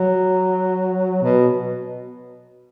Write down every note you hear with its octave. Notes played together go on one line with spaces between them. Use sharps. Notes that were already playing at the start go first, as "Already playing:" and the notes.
Already playing: F#3
B2